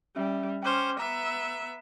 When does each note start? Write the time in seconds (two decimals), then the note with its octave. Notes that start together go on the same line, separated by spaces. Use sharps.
0.16 G3 C#4 E5
0.63 C#4 C5 G5 D6 F6
0.99 B3 E5 A#5